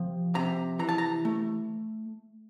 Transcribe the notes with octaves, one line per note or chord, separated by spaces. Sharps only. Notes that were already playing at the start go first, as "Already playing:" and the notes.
Already playing: C3 F3
C3 A#5
E3 A#5
A5
A#5
A3